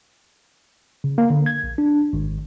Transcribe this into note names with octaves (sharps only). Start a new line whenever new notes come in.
C#3
A#3
D3
G#6
A#1
D4
G#1